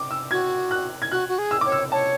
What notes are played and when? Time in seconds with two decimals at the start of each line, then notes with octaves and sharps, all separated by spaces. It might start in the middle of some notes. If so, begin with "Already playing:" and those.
Already playing: D6
0.11 E6
0.31 F#4 G#6
0.71 F#6
1.02 G#6
1.11 F#4 F#6
1.29 F#4
1.38 G#4
1.51 E6
1.61 C#5 D6
1.72 E6
1.92 C#5 A5